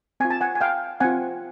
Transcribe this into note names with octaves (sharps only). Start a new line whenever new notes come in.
C4 F4 G#5
A5
F#5 G#5
G#5
F5 G5
C4 F4 F#5 G#5